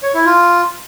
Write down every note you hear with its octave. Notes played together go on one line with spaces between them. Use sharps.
C#5
E4
F4